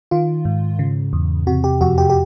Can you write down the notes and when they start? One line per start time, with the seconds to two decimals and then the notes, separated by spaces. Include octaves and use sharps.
0.11 D#3 F4
0.45 G#2
0.79 C#3
1.13 E2
1.47 C3 F#4
1.64 G4
1.81 F2 F#4
1.98 G4
2.10 G4